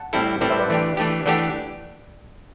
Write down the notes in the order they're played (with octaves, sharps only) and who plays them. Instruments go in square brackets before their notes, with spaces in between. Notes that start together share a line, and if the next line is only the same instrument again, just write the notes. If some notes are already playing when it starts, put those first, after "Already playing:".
Already playing: [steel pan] F#5 A5
[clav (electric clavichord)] A2 G3 C4 E4 A4
[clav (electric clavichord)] A2 G3 C4 E4 A4 [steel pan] B4 D5
[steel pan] C5 E5
B4 D5
[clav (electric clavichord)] E3 A3 D4 G4
E3 A3 D4 G4
[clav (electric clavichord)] E3 A3 D4 G4 [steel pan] D5 F#5